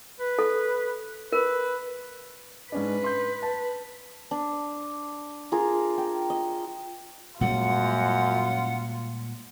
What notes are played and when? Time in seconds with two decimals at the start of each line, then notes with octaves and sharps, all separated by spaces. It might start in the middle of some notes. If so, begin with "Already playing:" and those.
0.19 B4
0.39 A4
1.33 A#4 B4
2.72 G#2 C#4 D4 B4
3.04 C6 G6
3.42 A5
4.31 D4
5.52 F4 G#4 A#4
5.98 G5
6.30 D#5
7.41 F#2 A#2 G3 G#3 F4 F#5